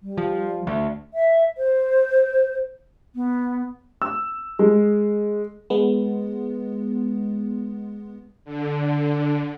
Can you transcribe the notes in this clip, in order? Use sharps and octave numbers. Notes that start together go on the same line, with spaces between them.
G3
F3
D2
E5
C5
B3
E6
G#3
G#3 B3
D3